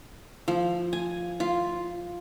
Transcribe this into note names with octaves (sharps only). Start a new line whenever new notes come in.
F3
G#5
F4